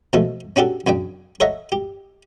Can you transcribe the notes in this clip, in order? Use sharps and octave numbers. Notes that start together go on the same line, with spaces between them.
B2 F3 G#3 A3 A4
C#4 D4 F#4 G4 A4
F#2 C#3 D4 G5
A4 C#5 D#5 E5 F#5 A#5
G4